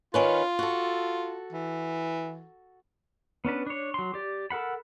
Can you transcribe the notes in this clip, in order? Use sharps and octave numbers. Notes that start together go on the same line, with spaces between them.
D#3 C#4 F4 B4
F#4 A4
E3
B3 C#4 D4 B4
D4 C#5
F#3 C6
G4 D5
A4 A#4 F#5 B5